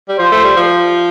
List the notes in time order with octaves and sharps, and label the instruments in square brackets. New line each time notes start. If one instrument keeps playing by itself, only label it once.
[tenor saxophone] G3
[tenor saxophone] F3 [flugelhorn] C5
[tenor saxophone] A3
G3
F3